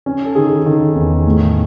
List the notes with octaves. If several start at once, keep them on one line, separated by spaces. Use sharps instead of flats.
C#4
A4
D#3 G#4
D#3 A4
E2
A2